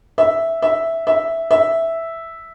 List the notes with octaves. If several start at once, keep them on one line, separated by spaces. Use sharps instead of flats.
E5
E5
E5
E5